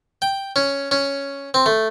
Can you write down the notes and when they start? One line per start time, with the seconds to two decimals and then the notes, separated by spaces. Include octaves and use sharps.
0.22 G5
0.56 C#4
0.91 C#4
1.54 C4
1.66 A3